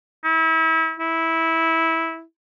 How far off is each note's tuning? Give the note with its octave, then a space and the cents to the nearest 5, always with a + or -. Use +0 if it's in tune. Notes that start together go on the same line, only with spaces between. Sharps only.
E4 -35
E4 -15